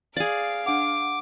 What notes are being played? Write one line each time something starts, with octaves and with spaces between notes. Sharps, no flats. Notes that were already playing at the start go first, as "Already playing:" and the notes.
G#4 D5 F5 D7
D4 F#5 D6